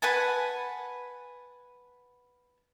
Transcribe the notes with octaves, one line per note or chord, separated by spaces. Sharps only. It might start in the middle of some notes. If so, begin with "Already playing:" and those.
B4 F#5 G#5 A5